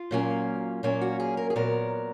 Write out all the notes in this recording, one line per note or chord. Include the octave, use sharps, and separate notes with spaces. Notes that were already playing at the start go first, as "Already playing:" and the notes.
Already playing: F4
A#2 F#3 A#3 C#4
A#2 F#3 A#3 C#4
F#4
G#4
A#4
G#4
A#2 F#3 B3 A#4